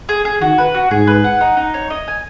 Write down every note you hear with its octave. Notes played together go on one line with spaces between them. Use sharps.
G#4
G#4
D#3 F#4
B4
F#4
G#2 G#4
B4
F#5
D#4
D#4
C#5
D#5
G#5